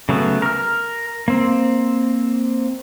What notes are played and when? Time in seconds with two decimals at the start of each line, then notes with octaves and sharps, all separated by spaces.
0.09 C#3 F#3 A3 B3
0.42 A#4 F6
1.28 A#3 C4